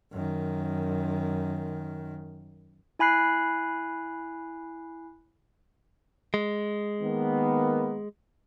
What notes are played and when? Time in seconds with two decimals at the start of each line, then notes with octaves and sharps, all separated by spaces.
0.12 F#2 D#3
2.99 E4 G#5 B5 F#6 C7
6.34 G#3
7.01 D#3 A#3 B3